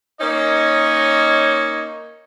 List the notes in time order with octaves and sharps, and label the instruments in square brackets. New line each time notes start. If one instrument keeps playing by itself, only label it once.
[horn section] A#3 C#4 D#4 C#5 D#5